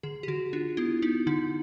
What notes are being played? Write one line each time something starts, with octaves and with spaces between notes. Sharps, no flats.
D3 G#4
G4
D3 F#4
D4 F4
B3 E4
B3 D#4
D3 D#4